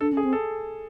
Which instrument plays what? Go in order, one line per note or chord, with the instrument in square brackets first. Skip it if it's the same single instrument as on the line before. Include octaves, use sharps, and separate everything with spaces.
[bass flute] D4 [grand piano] A4
[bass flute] C#4
[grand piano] G#4
[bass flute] C4
[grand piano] A4